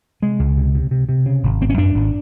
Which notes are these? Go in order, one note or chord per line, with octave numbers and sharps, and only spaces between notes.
C3 G#3
C#2
C3
C3
C3
C3
C#3
G#1
G#1 C4
C#4
F#2 D4
G#1